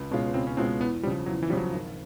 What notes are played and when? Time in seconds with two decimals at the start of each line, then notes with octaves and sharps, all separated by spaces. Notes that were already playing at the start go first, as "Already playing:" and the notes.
Already playing: C#2
0.11 B2 G#3 C#4 F4
0.34 C#2 C4
0.47 C#4
0.57 B2 G#3 C4 C#4 F4
0.80 E2 B3
1.03 C#3 F3 G3
1.26 E2 F#3
1.42 E3
1.49 F3 G3
1.53 C#3 F#3
1.72 G#1